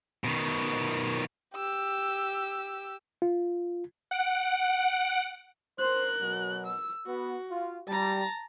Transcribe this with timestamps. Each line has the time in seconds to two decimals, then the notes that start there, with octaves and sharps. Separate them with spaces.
0.24 B2 D#3
1.55 G4 E6
3.22 F4
4.11 F#5 D7
5.79 A#4 C5 F#6
6.21 B2 F#3
6.67 E6
7.07 B3 F#4
7.50 F4
7.88 G3 A5 A#5